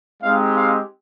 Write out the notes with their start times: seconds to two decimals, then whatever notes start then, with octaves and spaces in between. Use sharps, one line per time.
0.22 G#3 C4 D#4 G4 F5
0.56 F5